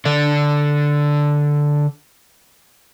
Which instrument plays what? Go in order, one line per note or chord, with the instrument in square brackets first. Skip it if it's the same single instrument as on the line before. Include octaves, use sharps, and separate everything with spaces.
[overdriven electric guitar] D3 D4